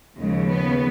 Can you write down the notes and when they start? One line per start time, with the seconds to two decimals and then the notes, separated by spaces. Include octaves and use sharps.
0.17 D#2 C#3 F3 G#3
0.50 B3